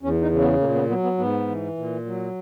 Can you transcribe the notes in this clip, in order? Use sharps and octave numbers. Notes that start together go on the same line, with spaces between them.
E2 C#4
D#4
C#3
B3
A#2 A#3
B3
F#3 B3
B3
G#2 B3
E3
A#2
F#3